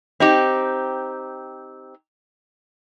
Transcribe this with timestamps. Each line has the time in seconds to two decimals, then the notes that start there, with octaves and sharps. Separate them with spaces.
0.20 C4 D#4 G4